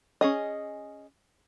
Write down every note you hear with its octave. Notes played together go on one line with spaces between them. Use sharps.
C#4 G#4 D#5